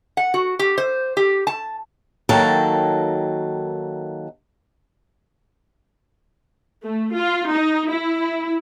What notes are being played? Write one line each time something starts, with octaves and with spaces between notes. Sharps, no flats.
F#5
F#4
G4
C5
G4
A5
D#3 F#3 A#3 A4 G5
A3
F4
D#4
E4